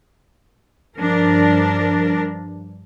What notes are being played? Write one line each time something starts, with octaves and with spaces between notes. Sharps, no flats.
G2 F3 D4 A#4